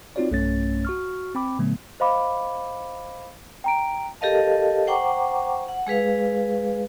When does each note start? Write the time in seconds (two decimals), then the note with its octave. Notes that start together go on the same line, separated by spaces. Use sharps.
0.16 C4 D#4 F4 F#4 C#5 D5
0.31 B1 G2 A3 C#4 C#5 A6
0.85 F#4 C#6 F6
1.35 C4 G5 B5 D6
1.59 A#2 D3 F#3 A3 B3
2.00 C5 D#5 F5 B5 D6
3.64 G5 A#5 D7
4.21 G4 A4 A#4 D#5 F5 A5
4.87 C5 F#5 G5 A#5 C#6 D6
5.68 F#5
5.87 G#3 G#4 B4 F5